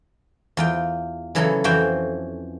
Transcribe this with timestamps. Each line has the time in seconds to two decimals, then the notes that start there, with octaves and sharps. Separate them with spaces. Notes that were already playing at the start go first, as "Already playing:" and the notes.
0.57 E2 F4 G5
1.35 C#3 E3 F#3 B3 C#4 A4
1.64 F2 E3 C#4 F#4 C5 G5